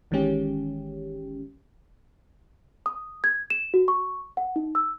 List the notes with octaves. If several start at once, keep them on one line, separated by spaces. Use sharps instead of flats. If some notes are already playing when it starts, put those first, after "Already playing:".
G1 D#3 E3 G#3 C#4 G4
D#6
G#6
E7
F#4
C#6
F#5
D#4
E6